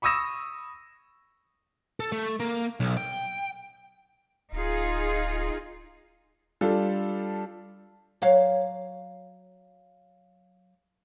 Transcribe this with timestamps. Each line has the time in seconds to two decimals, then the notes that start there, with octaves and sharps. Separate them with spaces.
0.02 B5 C#6 D#6 E6 A#6 E7
2.00 A4
2.12 A3
2.40 A#3
2.80 B1
2.97 G5
4.53 D1 D#4 F4 G#4
6.61 G3 D4 F4 A4
8.22 F#3 C#5 F5